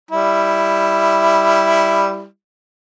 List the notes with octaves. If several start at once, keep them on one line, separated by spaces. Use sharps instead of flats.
G3 E4